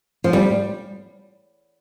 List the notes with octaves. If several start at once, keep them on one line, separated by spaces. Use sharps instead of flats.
F3
G3